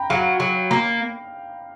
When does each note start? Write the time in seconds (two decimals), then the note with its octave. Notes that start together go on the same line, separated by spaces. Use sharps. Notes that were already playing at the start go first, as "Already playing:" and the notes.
Already playing: G5 A#5 B5
0.10 F#3 F5
0.40 F#3
0.71 A#3